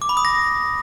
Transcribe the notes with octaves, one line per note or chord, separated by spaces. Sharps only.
D6
B5
D#6
A#6